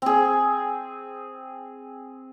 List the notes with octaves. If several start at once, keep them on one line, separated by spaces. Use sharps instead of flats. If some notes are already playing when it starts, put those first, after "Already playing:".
C4 G#4